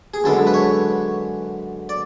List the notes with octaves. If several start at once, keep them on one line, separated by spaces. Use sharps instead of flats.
G#4
F#2 D3 G#3 B3 A4
B4
C#5
D5